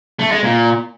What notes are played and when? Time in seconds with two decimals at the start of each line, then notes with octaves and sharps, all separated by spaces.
0.19 A3
0.31 G#3
0.43 A#2